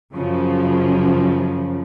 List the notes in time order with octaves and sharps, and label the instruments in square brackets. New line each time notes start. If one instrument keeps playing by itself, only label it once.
[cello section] F#2 C#3 F3